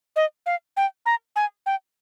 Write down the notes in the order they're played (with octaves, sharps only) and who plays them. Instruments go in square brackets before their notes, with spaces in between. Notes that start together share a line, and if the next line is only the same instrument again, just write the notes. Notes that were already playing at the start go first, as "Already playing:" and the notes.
[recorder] D#5
F5
G5
A#5
G#5
G5